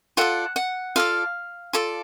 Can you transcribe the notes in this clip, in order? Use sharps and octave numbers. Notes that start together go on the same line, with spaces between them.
F4 A4 D5 F#5
F#5
F4 A4 D5 F5
F4 A4 D5